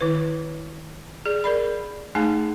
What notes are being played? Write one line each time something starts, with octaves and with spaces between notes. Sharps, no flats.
D#3 E4 B4
G#4 D5
A#4 D5 B5
A3 D#4 G#4 F5 G#5 A5